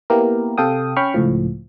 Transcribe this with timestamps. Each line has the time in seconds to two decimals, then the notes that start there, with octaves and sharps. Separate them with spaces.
0.10 A#3 B3 E4 G4 A#4
0.58 C3 A4 F5 G5 D#6
0.96 C#4 G5 B5 C#6 F6
1.14 C#2 A2 F3